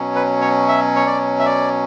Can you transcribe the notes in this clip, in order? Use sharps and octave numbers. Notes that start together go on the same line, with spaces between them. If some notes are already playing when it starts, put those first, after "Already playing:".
Already playing: B2 F#3 C#4
B4
C#5
E5
C#5
D5
E5
D5